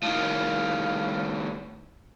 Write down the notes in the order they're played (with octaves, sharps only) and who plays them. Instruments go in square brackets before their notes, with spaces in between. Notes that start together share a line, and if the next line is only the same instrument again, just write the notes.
[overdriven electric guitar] A2 D#3 [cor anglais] F5